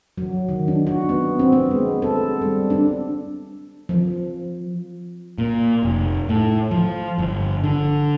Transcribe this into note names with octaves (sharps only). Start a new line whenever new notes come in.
F#3
D#3
D4
F#4
B3
C4
B3
G#3
A4
G3
D4
F3
A#2
F1
A2
F3
G1
D3